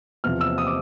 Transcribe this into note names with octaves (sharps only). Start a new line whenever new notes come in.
E2 C3 F3 F6
E6
D#6
D6